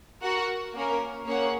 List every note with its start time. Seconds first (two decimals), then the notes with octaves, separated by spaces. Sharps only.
0.23 F#4 A#4 F#5
0.74 A#3 C#4 A#4
1.25 A#3 C#4 G#4 C#5 F#5